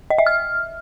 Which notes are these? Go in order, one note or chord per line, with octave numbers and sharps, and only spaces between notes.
D#5
E5
F6